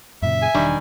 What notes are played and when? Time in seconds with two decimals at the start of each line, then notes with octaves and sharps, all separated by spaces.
0.22 F#2 A#2 C#3 E5
0.42 G#5
0.55 E1 D#3 G3 D4